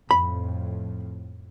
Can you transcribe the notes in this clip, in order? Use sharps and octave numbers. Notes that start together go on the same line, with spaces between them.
F2 A2 B5